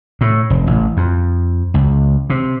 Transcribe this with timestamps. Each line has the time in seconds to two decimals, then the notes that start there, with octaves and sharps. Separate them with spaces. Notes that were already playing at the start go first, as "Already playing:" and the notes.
0.21 A2
0.50 F1
0.67 A1
0.97 F2
1.74 C#2
2.30 C3